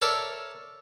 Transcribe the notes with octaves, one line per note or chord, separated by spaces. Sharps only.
A4 A#4 C#5 D5 E5 A5